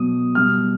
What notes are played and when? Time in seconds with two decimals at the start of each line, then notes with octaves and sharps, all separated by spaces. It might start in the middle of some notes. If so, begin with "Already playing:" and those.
Already playing: B2 F#3 D#6
0.35 B2 G3 F6